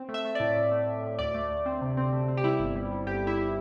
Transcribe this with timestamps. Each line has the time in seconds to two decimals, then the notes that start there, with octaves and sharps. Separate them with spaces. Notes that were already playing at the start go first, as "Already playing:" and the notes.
Already playing: C4
0.09 A3
0.14 E5
0.25 A3
0.35 D5
0.40 A2
0.56 A2
0.72 A3
0.87 A2
1.03 A2
1.19 D2 D5
1.34 A3
1.51 D2
1.66 C4
1.82 C3
1.97 C4
2.12 A3
2.28 C4
2.37 G4
2.44 G3 E4
2.60 G1
2.75 G3
2.91 G3
3.07 G1 G4
3.23 G1 E4